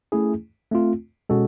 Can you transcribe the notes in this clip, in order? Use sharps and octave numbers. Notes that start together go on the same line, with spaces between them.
A3 C#4 E4 G#4
A3 C4 F4
B2 G#3 C#4 F#4 A4